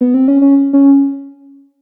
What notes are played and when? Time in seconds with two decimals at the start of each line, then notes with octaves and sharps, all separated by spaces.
0.01 B3
0.14 C4
0.28 C#4
0.42 C#4
0.73 C#4